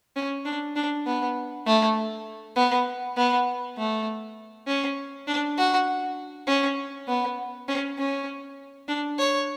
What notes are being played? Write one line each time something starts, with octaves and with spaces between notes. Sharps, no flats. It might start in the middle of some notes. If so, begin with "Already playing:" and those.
C#4
D4
D4
B3
A3
B3
B3
A3
C#4
D4
F#4
C#4
B3
C#4
C#4
D4
C#5